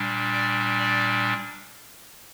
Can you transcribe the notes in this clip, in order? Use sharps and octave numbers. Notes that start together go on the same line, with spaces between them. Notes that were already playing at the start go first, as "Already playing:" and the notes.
Already playing: A#2 G3 D4
D5
D5